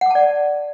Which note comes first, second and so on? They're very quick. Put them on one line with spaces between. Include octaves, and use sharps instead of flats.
F#5 D6 A5 D5